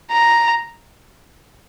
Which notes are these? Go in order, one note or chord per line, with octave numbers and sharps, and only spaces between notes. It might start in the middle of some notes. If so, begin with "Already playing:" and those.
A#5